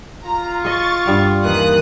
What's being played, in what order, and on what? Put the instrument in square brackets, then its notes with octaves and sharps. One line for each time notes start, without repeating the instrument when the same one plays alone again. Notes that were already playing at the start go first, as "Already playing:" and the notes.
[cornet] F4 [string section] A#5
[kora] G#4 D#5 [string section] C#6 A6
[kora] G2 G3 F#5
[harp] D#2 [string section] E3 D#6 F#6